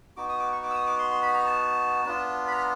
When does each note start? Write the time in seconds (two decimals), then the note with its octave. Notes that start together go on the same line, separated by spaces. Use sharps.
0.17 B3 D#4 F#4 D6
0.29 D#6
0.40 D6
0.52 C#6
0.63 D6
0.70 E6
0.75 D#6
0.87 D6
0.99 C6
1.11 C6
1.22 B5
1.34 A#5
1.46 A5
2.05 B3 D4 F4
2.48 B5
2.52 A#5